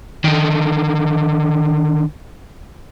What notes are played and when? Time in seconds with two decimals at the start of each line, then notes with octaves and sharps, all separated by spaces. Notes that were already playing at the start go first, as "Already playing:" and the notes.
0.24 D3 D#3